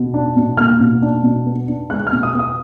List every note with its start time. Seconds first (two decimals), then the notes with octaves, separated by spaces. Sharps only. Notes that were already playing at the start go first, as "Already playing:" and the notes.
Already playing: B2
0.14 D4
0.36 B2
0.57 A#3 F6
0.80 B2
1.02 D4
1.23 B2
1.46 B3
1.68 D4
1.90 G#3 F#6
2.07 F6
2.12 B2
2.23 D#6
2.34 B3
2.39 D#6